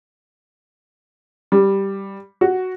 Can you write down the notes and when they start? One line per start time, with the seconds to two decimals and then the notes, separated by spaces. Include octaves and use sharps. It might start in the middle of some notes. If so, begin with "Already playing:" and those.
1.52 G3
2.41 F#4